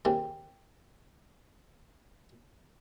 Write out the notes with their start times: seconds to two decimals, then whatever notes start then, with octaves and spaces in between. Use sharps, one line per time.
0.05 D#2 C#3 A#3 C4